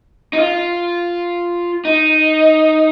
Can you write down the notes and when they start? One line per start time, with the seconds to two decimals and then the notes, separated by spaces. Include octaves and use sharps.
0.33 D#4
0.39 F4
1.85 D#4